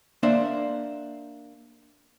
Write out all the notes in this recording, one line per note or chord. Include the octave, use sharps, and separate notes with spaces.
A#3 D4 C5 E5